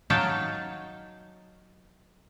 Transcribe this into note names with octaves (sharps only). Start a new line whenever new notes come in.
F#3 D#4 C#5 F5 G5 A5